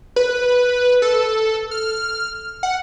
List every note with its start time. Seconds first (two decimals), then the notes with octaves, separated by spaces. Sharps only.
0.16 B4
1.02 A4
1.71 F6
2.63 F#5